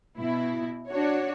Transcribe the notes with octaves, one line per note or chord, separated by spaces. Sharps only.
B2 E4
D4 F#4 C#5